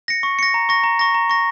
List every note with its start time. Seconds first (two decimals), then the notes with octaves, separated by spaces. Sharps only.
0.08 A#6 C#7
0.23 C#6
0.39 A#6 C#7
0.54 A#5
0.69 C#6 A#6
0.84 A#5
0.99 C#6 A#6
1.14 A#5
1.29 C#6 A#6